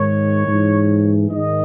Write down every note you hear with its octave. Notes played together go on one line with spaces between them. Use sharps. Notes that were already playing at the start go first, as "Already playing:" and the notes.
Already playing: G#2 D#3 C#5
G#2 E3
G#2 D#3 D#5